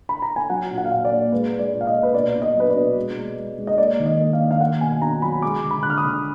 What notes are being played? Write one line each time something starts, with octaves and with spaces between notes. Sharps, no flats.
B5
A#5
G#5
F#3 F#5
A#2
F#5
F5
A#2 F#5
D5
A#3
G#3 B4
G#3
D5
A#2
F5
D#5
A#2
B4
B2 D5
B2
D#5
F#3 B4
D5
B2
G#3
G#3
G#3
G#3
D#5
A#3 D5
D#3
D#5
A#3
F5
D#3
F5
A#3 F#5
B2 G#5
B2 A#5
F#3 B5
G#3 D6
D3
B5
D3 F#6
F6
D#6
D3